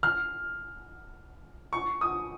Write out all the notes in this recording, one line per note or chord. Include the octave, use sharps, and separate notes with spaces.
F6
C#6
D#6